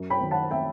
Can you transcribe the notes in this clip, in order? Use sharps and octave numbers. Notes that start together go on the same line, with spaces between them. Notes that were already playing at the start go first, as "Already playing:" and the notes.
Already playing: F#2
G5 B5
D#3 F#3
F#5 A5
E5 G5